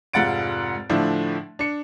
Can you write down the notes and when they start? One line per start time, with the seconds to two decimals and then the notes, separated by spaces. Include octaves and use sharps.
0.13 F1 G#2 F4 F#5 A6 D7
0.89 A2 D3 F3 D4 E4
1.59 D4 C#7